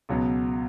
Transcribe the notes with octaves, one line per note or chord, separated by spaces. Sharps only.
C#2 B2 F#3 B3